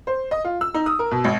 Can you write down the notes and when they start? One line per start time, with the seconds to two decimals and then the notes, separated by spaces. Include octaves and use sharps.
0.07 C5
0.31 D#5
0.45 F4
0.61 E6
0.74 D#4
0.86 D#6
0.99 A#4
1.11 B2
1.24 G#1